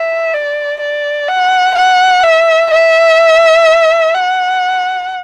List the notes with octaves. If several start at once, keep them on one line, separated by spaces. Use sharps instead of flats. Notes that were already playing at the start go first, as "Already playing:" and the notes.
Already playing: E5
D5
D5
F#5
F#5
E5
E5
F#5